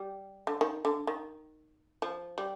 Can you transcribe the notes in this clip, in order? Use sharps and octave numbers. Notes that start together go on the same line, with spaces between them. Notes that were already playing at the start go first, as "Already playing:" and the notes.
Already playing: G3
D3
D#3
D3
D#3
F3
G3